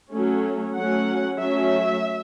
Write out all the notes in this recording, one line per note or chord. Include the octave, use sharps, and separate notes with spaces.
F#3 A3 C#4
F#3 A3 C#4 F#5
F#3 A3 C#4 E5